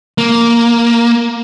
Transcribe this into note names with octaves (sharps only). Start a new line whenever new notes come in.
A#3